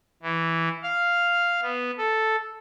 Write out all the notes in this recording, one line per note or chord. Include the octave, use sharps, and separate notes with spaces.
E3
F5
B3
A4